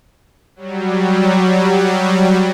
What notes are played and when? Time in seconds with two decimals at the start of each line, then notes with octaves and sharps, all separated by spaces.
0.56 F#3 G3